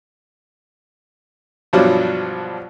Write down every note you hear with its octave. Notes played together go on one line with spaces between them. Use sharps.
G2 B2 F3 F#3 D4